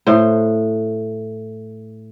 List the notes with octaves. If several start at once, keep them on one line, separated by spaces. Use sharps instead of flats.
A2 C5